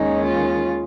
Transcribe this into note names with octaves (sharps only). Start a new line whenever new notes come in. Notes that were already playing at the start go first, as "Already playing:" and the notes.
Already playing: D#2 D#3 G#3 C#4 D#4
F4